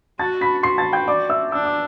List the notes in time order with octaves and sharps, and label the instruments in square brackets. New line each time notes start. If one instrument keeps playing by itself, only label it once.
[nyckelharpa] F#4 [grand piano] A5 A6
[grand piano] B5 B6
[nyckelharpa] F#4 [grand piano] C6 C7
[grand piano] A5 A6
G5 G6
D5 D6
E5 E6
[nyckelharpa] D4 [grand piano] E6
[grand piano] D6